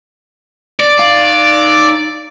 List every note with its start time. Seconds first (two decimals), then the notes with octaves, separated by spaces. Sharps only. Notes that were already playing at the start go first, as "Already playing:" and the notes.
0.80 D5
0.99 D#4 F5